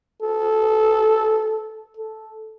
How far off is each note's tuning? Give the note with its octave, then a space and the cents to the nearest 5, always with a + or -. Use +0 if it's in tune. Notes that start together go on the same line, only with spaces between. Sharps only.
A4 -15
A4 -10